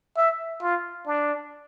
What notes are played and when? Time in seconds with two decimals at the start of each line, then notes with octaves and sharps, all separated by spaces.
0.17 E5
0.62 F4
1.06 D4